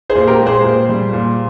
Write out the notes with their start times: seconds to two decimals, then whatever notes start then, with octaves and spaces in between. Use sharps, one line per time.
0.10 G#4 C5
0.15 A#2
0.27 G4 A#4
0.40 G#3
0.46 G#4 C5
0.64 A#2
0.89 G3
1.13 A#2